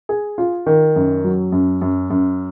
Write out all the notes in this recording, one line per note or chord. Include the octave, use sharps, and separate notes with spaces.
G#4
F4
D#3
F#2
F#3
F#2
F#2
F#2